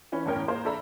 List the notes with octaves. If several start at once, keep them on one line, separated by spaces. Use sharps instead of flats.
E3 C#4 B4 B5
G1 E2 A2 C#4 A#4 G5
A#3 G#4 A#4 C5 F5
D4 A4 E5 A#5 B5